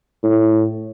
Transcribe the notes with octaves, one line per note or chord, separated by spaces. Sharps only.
A2